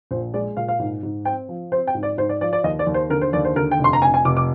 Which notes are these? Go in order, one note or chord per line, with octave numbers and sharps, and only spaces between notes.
A#1 C5
G#3 D5
A#2 F5
F5
G#2
G#2
C4 G5
F3
C4 C5
G5
G#2
D5
G#2 C5
D5
F3 D5
D5
D#2 D#5
D5
D#2
C5
D3 A#4
C5
D#2 D5
C5
D3 A#4
G5
F1
C6
A#5
F1 G#5
G#5
F1 D6
D6